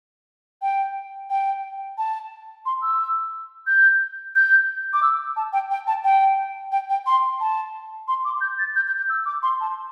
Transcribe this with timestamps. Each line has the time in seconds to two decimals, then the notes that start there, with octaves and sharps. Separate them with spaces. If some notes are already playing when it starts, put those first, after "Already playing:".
0.62 G5
1.30 G5
1.98 A5
2.66 C6
2.82 E6
3.67 G6
4.35 G6
4.93 D6
5.03 E6
5.36 A5
5.53 G5
5.71 G5
5.87 A5
6.04 G5
6.72 G5
6.90 G5
7.06 C6
7.40 A5
8.08 C6
8.25 D6
8.41 G6
8.59 A6
8.76 G6
8.87 G6
8.97 G6
9.09 E6
9.26 D6
9.43 C6
9.61 A5